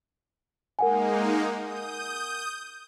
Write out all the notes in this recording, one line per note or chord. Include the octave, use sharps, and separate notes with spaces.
G#3 A#3 D#4 A#4 F#5 G#5
D#6 G6